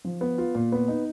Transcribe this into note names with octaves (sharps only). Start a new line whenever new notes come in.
F3
B3
F4
A#2
B3
D#4